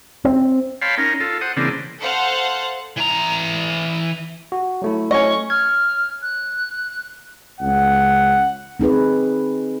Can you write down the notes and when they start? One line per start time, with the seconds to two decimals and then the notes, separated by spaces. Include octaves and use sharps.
0.25 C4
0.82 C#5 F5 G5 A5 B5 C6
0.98 C#4 D#4 A#4
1.20 F4 A4
1.41 C5 F#5 D#6
1.57 C#3 E3 A#3 C4 D4
2.01 A4 C5 F5 F#5
2.96 E3 A#5
4.52 F#4
4.82 F#3 A3 E4
5.11 C#4 D#5 C#6
5.50 F6 G#6
6.22 F#6
7.61 C#2 F#5
8.80 C4 D#4 G#4 B4